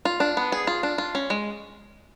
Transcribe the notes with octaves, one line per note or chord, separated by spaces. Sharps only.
F4
D4
B3
G#4
F4
D4
F4
C#4
G#3